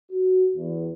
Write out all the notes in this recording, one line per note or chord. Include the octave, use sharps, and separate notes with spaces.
F#4
E2